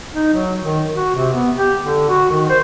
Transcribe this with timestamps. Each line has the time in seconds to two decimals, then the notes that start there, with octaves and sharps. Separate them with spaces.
0.14 D#4
0.34 F#3
0.63 D#3
0.92 F#4
1.15 C3
1.33 B3
1.57 G4
1.82 D3
2.09 F#4
2.31 D#3
2.50 C5